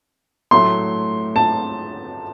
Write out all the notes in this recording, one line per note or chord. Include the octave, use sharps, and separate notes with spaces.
A2 F#3 A3 C6
A5